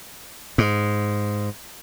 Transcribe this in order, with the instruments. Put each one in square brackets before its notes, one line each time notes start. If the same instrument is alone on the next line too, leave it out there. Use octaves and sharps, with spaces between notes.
[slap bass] G#2